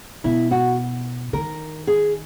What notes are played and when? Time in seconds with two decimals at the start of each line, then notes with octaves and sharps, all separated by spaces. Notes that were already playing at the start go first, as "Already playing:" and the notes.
0.24 B2 E4
0.51 F#4
1.33 D#3 A#4
1.87 G#4